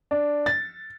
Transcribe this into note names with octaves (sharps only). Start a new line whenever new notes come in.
D4
A6